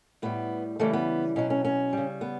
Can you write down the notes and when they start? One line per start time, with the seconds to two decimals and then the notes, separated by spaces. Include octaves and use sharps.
0.22 A2 G3 B3
0.79 C#3 E3 G3 A3
0.93 B3
1.36 B2 F#3 C#4
1.50 C#4
1.65 C#4
1.93 C#3 G3
2.21 B3